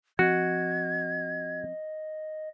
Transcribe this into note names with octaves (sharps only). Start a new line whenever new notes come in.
F3 C4 F#4 D#5 G#6